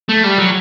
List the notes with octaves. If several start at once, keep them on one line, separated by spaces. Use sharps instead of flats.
A3
G3
F#3